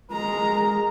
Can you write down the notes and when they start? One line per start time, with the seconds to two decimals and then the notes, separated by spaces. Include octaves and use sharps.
0.11 G#3 A#4 A#5